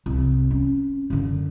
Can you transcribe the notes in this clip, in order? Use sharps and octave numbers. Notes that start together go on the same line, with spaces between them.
C2
C#4
F#2 D3